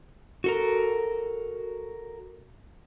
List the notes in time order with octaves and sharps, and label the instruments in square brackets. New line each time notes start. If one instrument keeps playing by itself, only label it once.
[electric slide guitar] F#4 A4 A#4